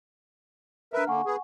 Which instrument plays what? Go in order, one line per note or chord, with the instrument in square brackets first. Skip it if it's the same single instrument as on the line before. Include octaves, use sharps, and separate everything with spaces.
[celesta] D4 A#5 F6 [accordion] A#4 B4 E5
[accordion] D3 A#3 [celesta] F#5 G#5 C#6
[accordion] B3 G#4